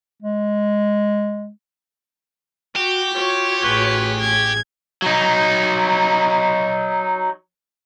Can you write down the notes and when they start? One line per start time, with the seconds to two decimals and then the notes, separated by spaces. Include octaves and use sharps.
0.22 G#3
2.76 F#4 G4
3.14 F4 F#4 C#5
3.62 A1 G#4 B4
4.20 G#6
5.02 F#3 D#4